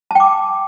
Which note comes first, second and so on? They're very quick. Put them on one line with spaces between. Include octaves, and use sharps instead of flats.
A5 G5 D6